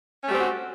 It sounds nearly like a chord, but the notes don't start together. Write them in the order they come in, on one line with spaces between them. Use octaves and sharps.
C#4 A3 G4 C4 F#4